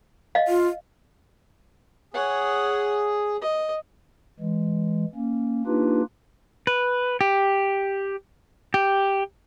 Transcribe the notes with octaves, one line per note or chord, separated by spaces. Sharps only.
D#5 F5
F4
G#4 C#5 F#5
D#5
E3 G#3
A#3 C#4
A#3 D4 D#4 F4 G4 B4
B4
G4
G4